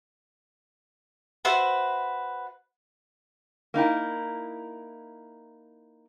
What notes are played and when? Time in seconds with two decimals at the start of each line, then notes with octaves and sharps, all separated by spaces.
1.45 F#4 B4 C5 E5
3.74 A#3 D#4 E4 G5